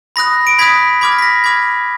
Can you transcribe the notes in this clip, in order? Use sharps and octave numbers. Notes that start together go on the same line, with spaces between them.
B5 D#6 F#6 A#6
D7
B5 D#6 F#6 G#6 B6
B5 D6 F6 G#6
A#6
B6
A#6
B5 D6 F6 G#6